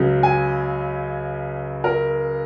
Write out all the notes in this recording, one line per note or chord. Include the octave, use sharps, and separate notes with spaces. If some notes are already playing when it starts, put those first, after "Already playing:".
Already playing: C#2 C#3 F#3
G#5
A#4